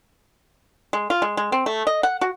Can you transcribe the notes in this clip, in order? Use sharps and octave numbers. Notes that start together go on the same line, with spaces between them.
G#3
F4
G#3
G#3
C4
A3
D#5
F#5
F#4